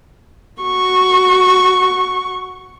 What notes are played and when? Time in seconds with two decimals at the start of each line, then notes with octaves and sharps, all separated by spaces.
0.62 F#4 C#6